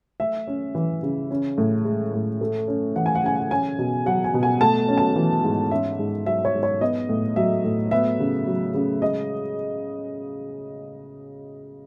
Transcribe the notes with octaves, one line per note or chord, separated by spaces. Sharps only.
A3 E5
C#4
E3
C#3
C#4
A2
G#3
A2
A3
C#4
E3 F#5
G#5
F#5
C#3 G#5
F#5
C#4 G#5
B2
F#3 F#5
G#5
B2
G#5
A3 A5
C#4
A5
E3
G#2
C#4 E5
G#2
F#3 E5
C#5
G#2
C#5
B3 D#5
A2
F#3 E5
A2
B3 E5
C#3
F#3
C#3
G#3 D#5